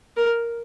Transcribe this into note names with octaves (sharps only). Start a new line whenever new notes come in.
A#4